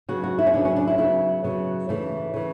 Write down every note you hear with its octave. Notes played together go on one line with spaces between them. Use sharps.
C#3 F#3 B3 F#4
F#4
E4
C#4
C#3 F#3 B3 D4
C#4
D4
E4
C#3 F#3 B3 E4
C#3 F#3 B3
C#3 E3 A3
C#3 E3